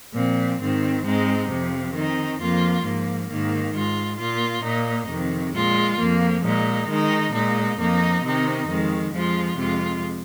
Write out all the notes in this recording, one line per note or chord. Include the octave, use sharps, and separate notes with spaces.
A#2 F3 C4
G#2 D#3 C4
G#2 G#3 C4 D#4
F2 C3 F3
D#3 C4 D#4
F2 F3 A#3 F4
G#2 F3 A#3
G#2 D#3 A#3
G#2 G#3 F4
A#2 A#3 F4
A#2 A#3 D#4
F2 C3 D#3
A#2 G#3 F4
F2 F3 A#3
A#2 G#3 D#4
D#3 G#3 D#4
A#2 G#3 D#4
F2 F3 A#3 D#4
C3 D#3 C4 D#4
F2 D#3 G#3
F2 F3 G#3 F4
F2 C3 G#3 F4